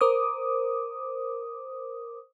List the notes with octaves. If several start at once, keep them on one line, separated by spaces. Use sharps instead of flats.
A#4 C5 D6 D#6